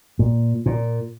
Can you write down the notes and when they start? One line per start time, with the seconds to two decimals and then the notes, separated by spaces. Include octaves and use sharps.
0.19 A#2
0.66 A#2